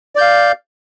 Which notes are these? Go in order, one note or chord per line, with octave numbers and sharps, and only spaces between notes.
D5 F5 G6